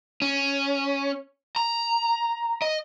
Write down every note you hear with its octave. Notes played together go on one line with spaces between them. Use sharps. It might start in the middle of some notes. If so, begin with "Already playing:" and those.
C#4
A#5
D#5